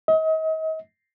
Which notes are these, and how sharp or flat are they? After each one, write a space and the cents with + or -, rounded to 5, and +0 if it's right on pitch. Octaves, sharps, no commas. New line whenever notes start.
D#5 +35